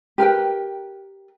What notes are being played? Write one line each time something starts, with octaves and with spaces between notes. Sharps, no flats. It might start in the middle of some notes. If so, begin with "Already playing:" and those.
G4 A#4 B4 G5